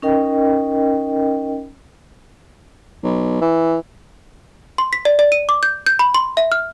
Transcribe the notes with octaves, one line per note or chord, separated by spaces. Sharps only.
C#4 D#4 A#4 D#5 G5
B1
E3
C6
B6
D5
D5
D#7
D6
G6
G6
B5
C6
E5
F6